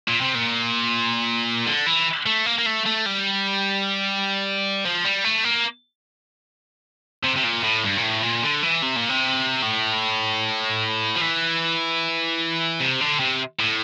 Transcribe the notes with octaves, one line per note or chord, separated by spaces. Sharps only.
A#2
C3
A#2
D3
E3
A3
A#3
A#3
A3
A3
G3
F3
G3
A3
A#3
C3
C3
A#2
A2
G2
A#2
A2
A#2
D3
E3
C3
A#2
C3
A2
F3
E3
C3
D3
C3
A2